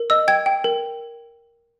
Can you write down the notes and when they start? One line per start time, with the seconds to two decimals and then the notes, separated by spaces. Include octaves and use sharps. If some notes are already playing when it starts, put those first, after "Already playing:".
Already playing: A#4
0.10 D#5 E6
0.28 G5 G#6
0.46 G5
0.64 A#4